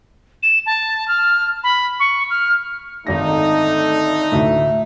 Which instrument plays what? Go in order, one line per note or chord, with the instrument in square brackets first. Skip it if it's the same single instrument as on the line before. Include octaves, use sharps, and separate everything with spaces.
[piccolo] E7
A5
F6
B5
C#6
F6
[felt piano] G#1 A#6 [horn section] D3 A3 D#4
[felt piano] D2 A2 [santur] E5